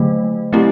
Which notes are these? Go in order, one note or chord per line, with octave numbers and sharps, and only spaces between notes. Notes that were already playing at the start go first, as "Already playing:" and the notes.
Already playing: D3 F#3 A3
F#3 A3 C4 E4 G4